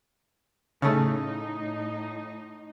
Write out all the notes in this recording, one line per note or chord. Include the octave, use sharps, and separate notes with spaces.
A2 C#3 A3 D#4